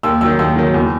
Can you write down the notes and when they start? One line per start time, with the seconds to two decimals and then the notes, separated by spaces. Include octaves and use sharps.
0.03 D#2 E6
0.21 D#3 F#3 E6
0.39 D#2 E6
0.56 D#3 F#3
0.74 E2